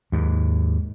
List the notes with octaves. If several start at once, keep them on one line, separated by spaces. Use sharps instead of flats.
D#2 G#2